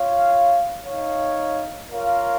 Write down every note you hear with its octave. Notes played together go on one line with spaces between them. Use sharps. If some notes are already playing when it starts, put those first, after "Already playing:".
Already playing: F4 C#5 F5
D#4 C#5 F5
F4 A#4 C#5 F5